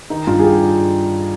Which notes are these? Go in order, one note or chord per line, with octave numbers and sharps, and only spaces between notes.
D#3 D#4
G2 F4
G#4
G4